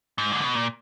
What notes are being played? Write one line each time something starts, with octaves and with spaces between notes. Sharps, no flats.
G#2
D3
B2
A#2